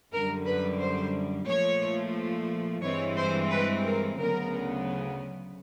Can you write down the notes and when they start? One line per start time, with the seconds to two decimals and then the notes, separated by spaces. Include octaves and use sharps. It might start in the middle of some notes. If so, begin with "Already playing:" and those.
0.12 F#2 D3 G3 A#4
0.46 B4
0.80 C5
1.47 A#2 F3 A3 C#5
2.83 G2 E3 G#3 C4 C#5
3.16 C5
3.51 B4
3.84 A#4
4.18 D2 C#3 F#3 B3 A#4